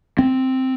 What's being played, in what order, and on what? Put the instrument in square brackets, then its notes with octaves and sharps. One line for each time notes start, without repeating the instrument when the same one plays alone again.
[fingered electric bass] C4